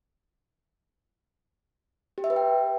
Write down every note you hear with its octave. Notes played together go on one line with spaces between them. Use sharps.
G4
E5
B4
G5